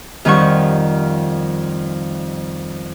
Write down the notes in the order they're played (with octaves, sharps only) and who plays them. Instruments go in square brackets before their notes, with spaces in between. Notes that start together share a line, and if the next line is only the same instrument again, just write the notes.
[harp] F2 D#3 F3 G3 F#5 C#6